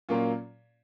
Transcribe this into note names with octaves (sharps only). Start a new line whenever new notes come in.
A#2 F#3 A#3 C#4 F4